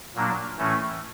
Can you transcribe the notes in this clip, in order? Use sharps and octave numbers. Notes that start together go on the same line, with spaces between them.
A#2 F#3 A#3 D4
A2 E3 A3 C#4